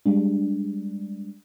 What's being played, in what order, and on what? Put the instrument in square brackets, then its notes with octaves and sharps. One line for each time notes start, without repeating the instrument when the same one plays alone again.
[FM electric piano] G3 G#3 D4